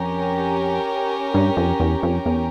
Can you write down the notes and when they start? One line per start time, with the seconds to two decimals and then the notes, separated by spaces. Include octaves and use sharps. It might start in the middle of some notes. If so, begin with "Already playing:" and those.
Already playing: F2 C#4 G4 A#4
1.34 G2
1.57 F2
1.80 E2
2.03 F2
2.26 E2